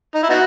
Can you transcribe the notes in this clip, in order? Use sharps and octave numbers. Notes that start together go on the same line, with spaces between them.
D#4
E4
B3 D#4 F#4